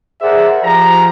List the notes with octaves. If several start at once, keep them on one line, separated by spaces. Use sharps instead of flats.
G#4 A#4 C5 D5 E5 F#5
F3 G4 A#5